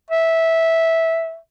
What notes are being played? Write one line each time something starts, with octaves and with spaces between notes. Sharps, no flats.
E5